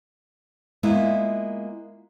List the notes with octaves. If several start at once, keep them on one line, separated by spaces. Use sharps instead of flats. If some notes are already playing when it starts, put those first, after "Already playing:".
G#3 A#3 B3 E4 F4